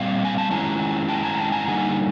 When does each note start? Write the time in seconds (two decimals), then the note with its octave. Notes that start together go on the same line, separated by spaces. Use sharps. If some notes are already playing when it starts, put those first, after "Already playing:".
Already playing: A#2 G3 C4 F5
0.25 G#5
0.38 A5
0.50 D#3 G#3 C#4 E4 G#5 A#5
1.08 G5 A5
1.23 G#5 A#5
1.38 G5 A5
1.52 G#5 A#5
1.68 D3 G3 A#3 D#4 F#5 G#5